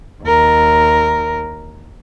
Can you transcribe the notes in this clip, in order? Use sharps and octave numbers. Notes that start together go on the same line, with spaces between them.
D#2 A#4